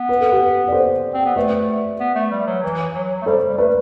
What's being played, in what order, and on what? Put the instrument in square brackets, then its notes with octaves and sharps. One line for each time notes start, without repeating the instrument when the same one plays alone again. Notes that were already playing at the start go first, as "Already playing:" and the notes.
Already playing: [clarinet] B3
[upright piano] B4
A4
G4 B4
D5
A4 C5
[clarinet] C4
B3
[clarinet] A3 [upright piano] B4 D5
[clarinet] B3
A3
G3
F#3
E3
F#3
A3
[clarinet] G3 [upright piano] A4 C5
[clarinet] G3
[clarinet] A3 [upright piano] B4 D5